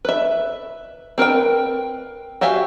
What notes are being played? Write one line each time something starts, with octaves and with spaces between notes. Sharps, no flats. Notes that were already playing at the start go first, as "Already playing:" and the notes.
B4 E5
C4 A#4 B4 G5
F#4 G4 E5 F5 G#5